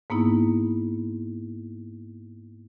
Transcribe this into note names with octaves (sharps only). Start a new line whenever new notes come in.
G#2 A#3 B3 D#4 E4